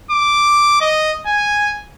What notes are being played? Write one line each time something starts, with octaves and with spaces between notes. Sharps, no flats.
D6
D#5
G#5